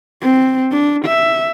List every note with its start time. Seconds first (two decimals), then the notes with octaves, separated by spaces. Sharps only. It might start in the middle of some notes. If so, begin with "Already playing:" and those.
0.21 C4
0.71 D4
1.06 E5